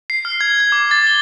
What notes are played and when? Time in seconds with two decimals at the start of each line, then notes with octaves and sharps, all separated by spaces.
0.10 C7
0.25 F6
0.41 G#6
0.60 G#6
0.72 D6
0.91 A6
1.07 G7